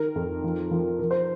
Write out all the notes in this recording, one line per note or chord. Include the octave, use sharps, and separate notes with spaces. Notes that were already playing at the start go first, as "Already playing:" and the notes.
Already playing: D#3 A#4
F2
F3
F3
F3 A#4
C5